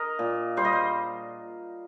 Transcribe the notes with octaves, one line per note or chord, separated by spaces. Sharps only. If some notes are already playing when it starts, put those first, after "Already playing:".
Already playing: A#4 D#5
A#2
G3 C5
D#5
C5